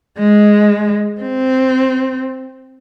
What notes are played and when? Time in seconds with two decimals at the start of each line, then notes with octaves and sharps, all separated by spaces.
0.19 G#3
1.22 C4